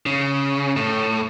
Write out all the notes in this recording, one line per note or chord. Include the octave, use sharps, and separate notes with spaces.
C#3
A2